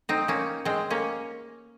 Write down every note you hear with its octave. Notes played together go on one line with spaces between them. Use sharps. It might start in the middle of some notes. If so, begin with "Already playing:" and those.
C4 D#4
A#3 C#4
G#3 C4
A#3 C#4